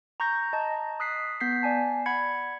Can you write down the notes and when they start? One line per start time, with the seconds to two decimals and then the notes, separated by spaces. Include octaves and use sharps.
0.20 A#5 C#6 G6 A#6
0.53 D#5 A5 A#5
1.00 D#6 F#6 B6 C7
1.41 B3 G6 B6 C7
1.63 D5 G#5 A5
2.06 F#5 B5 G#6 C#7